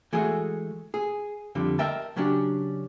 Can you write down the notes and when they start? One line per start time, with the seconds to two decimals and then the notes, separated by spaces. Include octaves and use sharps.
0.13 E3 G#3 A3 F#4 G#4
0.94 G#4
1.55 F2 D3 G3
1.79 A#4 D#5 E5 G5 A5
2.16 C#3 F#3 C#4 D4 G4